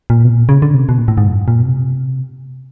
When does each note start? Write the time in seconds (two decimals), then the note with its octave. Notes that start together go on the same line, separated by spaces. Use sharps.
0.10 A#2
0.25 B2
0.29 A#2
0.49 C#3
0.62 D3
0.75 C3
0.89 B2
0.98 A#2
1.08 A2
1.18 G#2
1.27 F#2
1.48 A#2
1.60 B2
1.67 C3